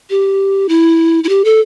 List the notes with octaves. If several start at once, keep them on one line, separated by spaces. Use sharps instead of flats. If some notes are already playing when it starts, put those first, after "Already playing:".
G4
E4
E4
G4
A4